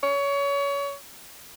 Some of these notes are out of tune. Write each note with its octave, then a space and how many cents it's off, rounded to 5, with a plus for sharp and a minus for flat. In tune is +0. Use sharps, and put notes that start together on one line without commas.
C#5 +25